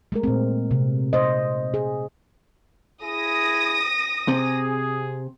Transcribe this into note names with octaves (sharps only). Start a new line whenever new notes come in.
G#3 A3 A#4
A#2 C4
C3
C5 D#5
G#4
E4 G#4 D#6 A#6
C3 G#4